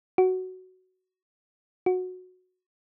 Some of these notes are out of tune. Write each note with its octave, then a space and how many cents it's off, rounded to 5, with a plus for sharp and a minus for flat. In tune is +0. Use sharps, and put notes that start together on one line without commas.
F#4 +5
F#4 -15